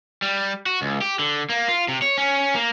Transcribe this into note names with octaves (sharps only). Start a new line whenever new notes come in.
G3
F#4
C#2
G4
D3
A#3
F4
C3
C#5
C#4
A#3